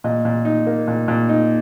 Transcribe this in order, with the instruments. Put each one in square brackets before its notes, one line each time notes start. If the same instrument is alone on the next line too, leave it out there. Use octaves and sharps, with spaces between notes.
[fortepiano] A#2 D#5
A#2
D#4
A#3
A#2
A#2
D#4